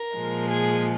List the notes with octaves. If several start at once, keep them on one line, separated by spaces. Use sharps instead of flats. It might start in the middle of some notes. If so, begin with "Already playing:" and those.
Already playing: A#4
A#2 F3 G#3
G#4